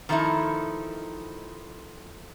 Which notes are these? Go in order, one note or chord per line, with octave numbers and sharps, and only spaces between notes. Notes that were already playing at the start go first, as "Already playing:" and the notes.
D#3 F3 A3 D#4 E4